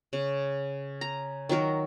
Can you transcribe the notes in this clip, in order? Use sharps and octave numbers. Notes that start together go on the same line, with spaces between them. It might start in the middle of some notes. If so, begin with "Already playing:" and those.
C#3
A#5
D#3 F#3 F#4 A#4